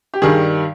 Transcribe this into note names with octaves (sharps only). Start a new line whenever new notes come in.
G4
G2 D#3 G3 G#4